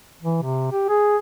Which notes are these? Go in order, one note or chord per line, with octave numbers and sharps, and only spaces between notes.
E3
C3
G4
G#4